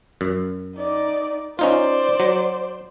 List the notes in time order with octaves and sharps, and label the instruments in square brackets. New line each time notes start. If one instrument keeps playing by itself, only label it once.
[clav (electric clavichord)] F#2
[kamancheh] D#4 D5
[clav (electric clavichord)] C#4 D#4 F4 [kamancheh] C5 D5
[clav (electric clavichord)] F#3